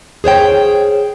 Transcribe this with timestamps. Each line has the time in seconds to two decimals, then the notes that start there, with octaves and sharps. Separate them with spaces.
0.24 G#4 C5 C#5 G5